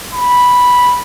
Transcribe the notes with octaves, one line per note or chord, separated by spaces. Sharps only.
B5